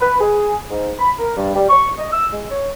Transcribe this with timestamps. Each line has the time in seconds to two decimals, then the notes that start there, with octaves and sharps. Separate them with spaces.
0.01 B4
0.21 G#4
0.70 G#2
0.99 B5
1.19 A#4
1.37 G2
1.56 G3
1.69 C#6
1.99 D#5
2.12 E6
2.33 G#3
2.51 C#5